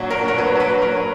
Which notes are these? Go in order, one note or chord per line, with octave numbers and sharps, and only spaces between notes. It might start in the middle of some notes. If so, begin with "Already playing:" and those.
Already playing: A#2 F#3 D4 F#4
A#4
A#4
B4
B4
A#4